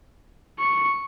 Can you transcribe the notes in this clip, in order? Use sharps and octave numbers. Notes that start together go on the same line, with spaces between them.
C#6